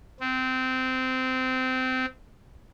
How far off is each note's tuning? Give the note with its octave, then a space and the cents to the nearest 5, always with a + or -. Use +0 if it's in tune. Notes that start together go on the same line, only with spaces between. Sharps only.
C4 -20